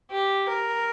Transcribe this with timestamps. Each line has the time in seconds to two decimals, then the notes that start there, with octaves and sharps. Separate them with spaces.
0.11 G4
0.49 A#4